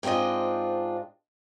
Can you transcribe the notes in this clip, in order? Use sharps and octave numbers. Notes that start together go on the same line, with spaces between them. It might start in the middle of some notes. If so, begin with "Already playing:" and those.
G#2 C4 D4 F4 D#5